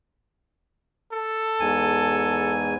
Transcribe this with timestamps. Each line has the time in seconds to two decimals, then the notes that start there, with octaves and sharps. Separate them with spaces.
1.12 A4
1.60 E2 G#2 G#5